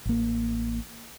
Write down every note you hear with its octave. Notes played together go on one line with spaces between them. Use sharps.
A1 A#3